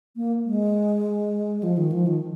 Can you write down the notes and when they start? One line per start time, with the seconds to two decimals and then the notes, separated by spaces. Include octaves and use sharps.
0.16 A#3
0.46 G#3
1.63 F3
1.77 D#3
1.92 F3
2.07 D#3